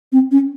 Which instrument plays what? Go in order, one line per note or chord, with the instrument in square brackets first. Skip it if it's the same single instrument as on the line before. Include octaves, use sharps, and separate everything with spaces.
[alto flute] C4
C#4